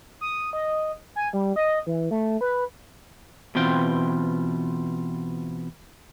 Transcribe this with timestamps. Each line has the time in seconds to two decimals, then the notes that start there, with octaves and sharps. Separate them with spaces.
0.21 D#6
0.53 D#5
1.16 G#5
1.33 G3
1.56 D#5
1.86 E3
2.11 A3
2.41 B4
3.55 B2 E3 C4 F4 G5